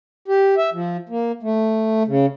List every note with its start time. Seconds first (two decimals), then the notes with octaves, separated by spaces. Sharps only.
0.28 G4
0.57 E5
0.73 F3
1.09 A#3
1.43 A3
2.08 C#3